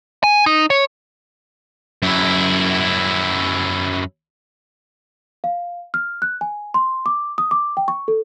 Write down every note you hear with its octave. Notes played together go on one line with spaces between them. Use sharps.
G#5
D#4
C#5
F#2 E4
F5
F6
F#6
G#5
C6
D6
D#6
D6
G5
C#6
A4